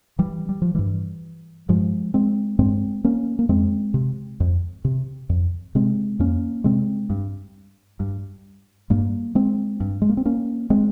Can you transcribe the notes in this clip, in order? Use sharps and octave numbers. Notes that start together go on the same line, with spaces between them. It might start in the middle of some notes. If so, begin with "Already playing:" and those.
E3 G3
G3
F3
G2 E3 G3
G2 F3 G#3
G#3 C4
G2 G#3 C4
A#3 C#4
A#3
F2 G#3 C4
C3
F2
C3
F2
C3 G#3 C4
F2 A#3 C#4
C3 G#3 C4
G2
G2
G2 G3 A#3
G#3 C4
G2
G#3
A#3
C4
A#3 C#4
G#3 C4